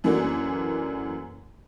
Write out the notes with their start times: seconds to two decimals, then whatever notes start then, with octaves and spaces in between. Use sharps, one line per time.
0.04 F#2 E3 A3 A#3 D4 F#4